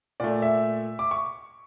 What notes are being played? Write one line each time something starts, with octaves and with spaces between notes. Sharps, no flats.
A#2 A3 D5
E5
D6
C#6